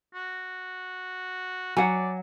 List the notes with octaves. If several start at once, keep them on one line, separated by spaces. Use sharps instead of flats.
F#4
F#3 D5 F#5 G#5